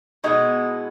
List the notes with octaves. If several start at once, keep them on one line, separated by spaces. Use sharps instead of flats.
B2 G#3 B3 D#4 E4